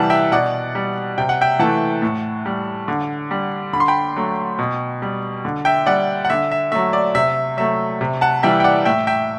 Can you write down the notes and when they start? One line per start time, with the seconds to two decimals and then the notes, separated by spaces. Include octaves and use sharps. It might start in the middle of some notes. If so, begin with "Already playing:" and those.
Already playing: C3 E3 G3 F#5 A5
0.10 E5 G5
0.32 B2 D5 F#5
0.75 G3
1.18 C3 G5
1.29 F#5
1.41 E5 G5
1.59 E3 A3 F#5 A5
2.02 A2
2.46 G3
2.88 D3
3.31 G3
3.73 D3 B5
3.80 C6
3.88 G5 B5
4.16 F#3 A3
4.59 B2
5.02 G3
5.45 D3
5.65 E5 G5
5.86 G3 D5 F#5
6.25 F#5
6.30 D3 E5
6.51 E5
6.72 F#3 A3 E5
6.93 D5
7.15 C3 E5
7.57 F#3 A3 E5
8.01 C3
8.21 F#5 A5
8.43 E3 G3 E5 G5
8.60 G5
8.64 D5 F#5
8.85 A2 E5 G5
9.07 E5 G5